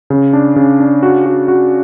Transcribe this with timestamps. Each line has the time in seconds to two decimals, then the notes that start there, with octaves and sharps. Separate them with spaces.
0.10 C#3
0.33 D4
0.56 C#3
0.80 D4
1.03 F#4
1.26 F#4
1.48 F#4